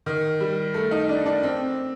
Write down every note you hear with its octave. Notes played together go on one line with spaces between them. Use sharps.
D#3
G3
A3
D#4
D4
D4
C4